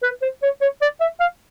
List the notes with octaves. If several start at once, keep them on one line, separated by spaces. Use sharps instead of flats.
B4
C5
C#5
C#5
D5
E5
F5